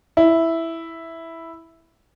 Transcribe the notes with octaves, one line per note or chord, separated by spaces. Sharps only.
E4